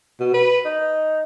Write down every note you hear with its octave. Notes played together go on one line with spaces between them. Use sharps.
B2
B4
D#4